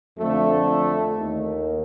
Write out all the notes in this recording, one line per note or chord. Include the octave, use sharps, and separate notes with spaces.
F2 D3 A3
D#2 D#3